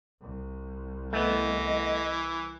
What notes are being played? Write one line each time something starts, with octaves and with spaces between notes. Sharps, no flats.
C2
E3 A3 B3 D#5